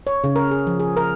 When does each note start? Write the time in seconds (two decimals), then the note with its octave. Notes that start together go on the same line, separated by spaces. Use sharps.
0.07 C#5
0.24 C#3
0.36 A#4
0.51 G#4
0.67 F3
0.80 G#4
0.97 A#4